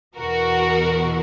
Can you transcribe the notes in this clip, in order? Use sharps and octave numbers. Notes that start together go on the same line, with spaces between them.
E2 B2 F#4 A#4